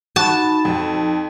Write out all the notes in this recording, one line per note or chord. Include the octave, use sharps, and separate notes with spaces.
D#4 F#4 A5 B5
F2 D#4